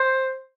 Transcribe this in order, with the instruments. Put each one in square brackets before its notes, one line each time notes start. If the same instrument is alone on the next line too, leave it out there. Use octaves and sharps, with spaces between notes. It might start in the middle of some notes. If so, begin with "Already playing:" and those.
Already playing: [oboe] C5